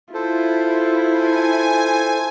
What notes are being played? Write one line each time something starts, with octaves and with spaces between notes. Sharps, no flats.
E4 F4 A4 C5
G#5